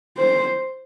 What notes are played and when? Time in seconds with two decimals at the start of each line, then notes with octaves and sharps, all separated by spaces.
0.17 C5